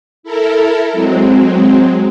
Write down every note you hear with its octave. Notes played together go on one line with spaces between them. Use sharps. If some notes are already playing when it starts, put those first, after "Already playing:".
E4 A4 A#4
F#3 G#3 C4